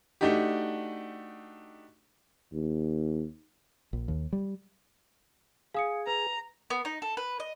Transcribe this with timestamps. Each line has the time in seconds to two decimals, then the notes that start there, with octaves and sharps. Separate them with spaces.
0.21 A3 D4 D#4 F#4 G4
2.53 D#2
3.93 A#1
4.08 D#2
4.33 G3
5.74 G#4 F5 D#6 C#7
6.07 B4 A#5
6.70 B3
6.85 D#4
7.02 A4
7.17 B4
7.40 D#5